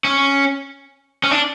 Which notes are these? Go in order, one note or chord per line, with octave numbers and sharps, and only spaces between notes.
C#4
C#4
D4